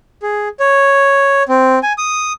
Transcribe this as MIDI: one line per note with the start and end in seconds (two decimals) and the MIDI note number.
0.23 0.48 68
0.60 1.43 73
1.49 1.79 60
1.83 1.93 80
1.98 2.33 87